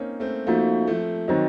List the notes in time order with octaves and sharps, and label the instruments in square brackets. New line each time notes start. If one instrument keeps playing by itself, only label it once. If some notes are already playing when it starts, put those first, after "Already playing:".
Already playing: [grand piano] A#3 C4 C#4 D#4
A3 C4
[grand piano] F3 A3 [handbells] A#3 D#4 F#4
[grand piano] F3 A3
[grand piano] D#3 F#3 [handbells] C4 D#4 F#4 C5 D#5